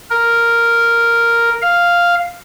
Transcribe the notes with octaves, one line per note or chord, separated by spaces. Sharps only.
A#4
F5